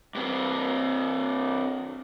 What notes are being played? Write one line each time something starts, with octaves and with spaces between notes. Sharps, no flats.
G2 C4